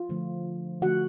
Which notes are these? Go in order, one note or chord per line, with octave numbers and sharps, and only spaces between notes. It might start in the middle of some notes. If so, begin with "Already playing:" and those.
Already playing: F4
D3 F3 A3
D3 F3 A3 F#4 F#5